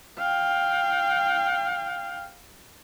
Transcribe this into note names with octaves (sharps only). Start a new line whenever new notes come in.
F5 G5